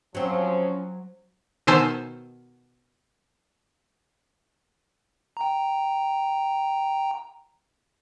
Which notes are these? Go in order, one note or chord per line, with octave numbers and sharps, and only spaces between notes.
F3 F#3 C4 C#4
B2 D#3 C5 G#5 A5 E6
G5 A#5